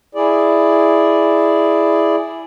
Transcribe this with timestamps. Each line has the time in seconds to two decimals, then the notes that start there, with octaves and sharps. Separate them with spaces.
0.15 E4 G#4 D5